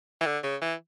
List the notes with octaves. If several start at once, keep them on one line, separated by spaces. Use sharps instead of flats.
E3
D3
C#3
E3